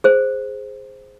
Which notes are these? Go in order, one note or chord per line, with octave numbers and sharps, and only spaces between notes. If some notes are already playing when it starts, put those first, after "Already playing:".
G#4 C5